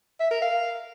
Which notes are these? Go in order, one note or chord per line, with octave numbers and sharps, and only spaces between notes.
E5
A#4
F5